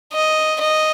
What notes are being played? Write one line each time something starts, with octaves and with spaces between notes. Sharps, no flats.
D#5
D#5